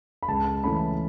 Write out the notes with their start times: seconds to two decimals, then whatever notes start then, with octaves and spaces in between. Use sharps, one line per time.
0.23 B5
0.28 C#2 A5
0.64 C#3 E3 A3 C#4 B5